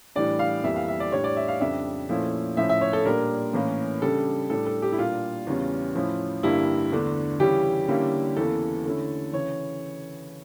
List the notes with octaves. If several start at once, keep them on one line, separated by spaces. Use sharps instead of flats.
A2 E3 G3 D4 D5
F5
F2 E3 G3 A#3 E5
F5
E5
D5
A2 G3 D4 C#5
D5
E5
F5
F2 C#3 G3 D4 E5
A#2 F3 A3 C#4 E4
A2 F3 C#4 E5
E5
C#5
A4
A#2 G3 D4 A#4
A2 E3 A#3 C#4
C#3 G3 D4 A4
A2 G3 D4 A4
A4
G4
E4
A#2 G3 A#3 D4 F4
E2 C#3 E3 G3 C#4
A2 F3 C#4 E4
G2 D3 G3 A#3 E4
E2 D3 A3 D4
C#3 E3 G3 C#4 E4 G4
D3 G3 A#3 C#4 E4
E2 C#3 E3 A#3 E4 A4
D3 A3 C#4 E4
C#3 E3 C#5